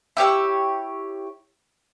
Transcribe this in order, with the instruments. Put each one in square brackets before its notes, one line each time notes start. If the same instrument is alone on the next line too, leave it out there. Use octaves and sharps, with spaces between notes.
[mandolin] E4 G4 C#5 E6